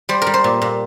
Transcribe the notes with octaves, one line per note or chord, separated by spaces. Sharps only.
G3 C5
G3 A#4
C5
A#2
A#2